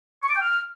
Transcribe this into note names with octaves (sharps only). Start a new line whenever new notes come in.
C#6
D6
G5
F6